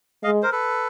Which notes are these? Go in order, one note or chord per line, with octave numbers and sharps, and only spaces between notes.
G#3 D#5 F5
A#4 C5
A4 B4